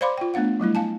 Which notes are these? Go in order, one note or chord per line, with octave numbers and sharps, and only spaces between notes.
C5 D5 F5 B5 C6 D6
F4 G5
A3 B3 D4 F5 F#5
F#3 G3 A3 E4
F5 G#5 A5